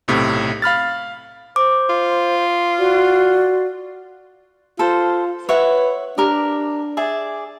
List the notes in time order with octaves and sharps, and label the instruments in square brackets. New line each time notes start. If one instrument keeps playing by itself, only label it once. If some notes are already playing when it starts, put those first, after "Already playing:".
[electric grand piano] B1 A2 C3
F5 B5 F6 A6
[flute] C5 [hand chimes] D6
[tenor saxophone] F4
[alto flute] F#4 [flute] D5
[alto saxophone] F4 [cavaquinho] A4 C5
[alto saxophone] B4 [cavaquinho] C#5 E5 F#5
[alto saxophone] D4 [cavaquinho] G4 A#4
[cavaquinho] G#4 D5 E5